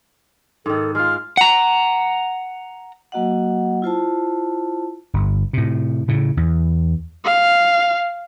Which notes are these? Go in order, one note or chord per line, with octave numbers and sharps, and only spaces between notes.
G#2 D#3 A4
G#3 F4 F6
F#5 A#5
F#3 A#3 F#4 D#5 F#5
E4 F4 C5 A5
G1
A2 C3
A2 C#3
E2
F5